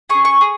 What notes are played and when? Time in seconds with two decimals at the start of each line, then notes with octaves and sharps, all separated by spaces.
0.09 C#4 G#4 C#6
0.25 C#6
0.41 G#4